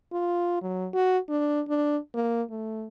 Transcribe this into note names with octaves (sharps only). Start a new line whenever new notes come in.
F4
F#3
F#4
D4
D4
A#3
A3